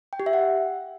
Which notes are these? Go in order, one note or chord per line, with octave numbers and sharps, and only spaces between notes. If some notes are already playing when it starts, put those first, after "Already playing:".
G5
G4
E5
F#5